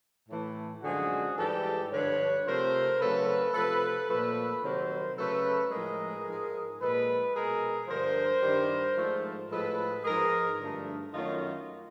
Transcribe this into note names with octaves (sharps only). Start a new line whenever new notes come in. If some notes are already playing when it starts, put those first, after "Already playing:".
A2 E3 A3
F#2 D3 F3 G#3 F#4 G#4
G#2 E3 G3 G4 A4
G2 D3 F3 B4 C#5
C3 F3 A3 A#4 C5
F#2 C#3 F#3 A3 A4 B4
C3 F3 A3 A4 B4
A#2 F3 A3 A4 B4
C3 D#3 F#3 A#4 C5
C#3 F#3 A3 A4 B4
A2 F3 G#3 G#4 A#4
G#2 F3 G#3
A#2 F3 G#3 A4 B4
B2 G#3 G#4 A#4
G2 D3 F3 A#4 C5
G2 D#3 G3
G#2 F3 A3
A2 F3 G#3 A4 B4
G#2 F3 G#3 G#4 A#4
G2 D3 F3 A3
F#2 D#3 F#3 A3 D#4 F4